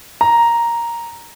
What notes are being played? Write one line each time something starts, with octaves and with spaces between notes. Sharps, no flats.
A#5